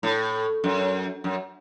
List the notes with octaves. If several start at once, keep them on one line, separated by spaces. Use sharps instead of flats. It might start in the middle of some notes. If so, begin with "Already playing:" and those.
A2
F#2
F#2